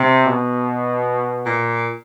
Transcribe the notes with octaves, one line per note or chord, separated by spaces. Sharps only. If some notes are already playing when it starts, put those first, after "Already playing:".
Already playing: C3
B2
A#2